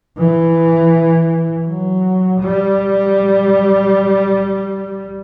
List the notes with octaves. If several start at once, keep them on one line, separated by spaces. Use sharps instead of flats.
E3
F#3
G3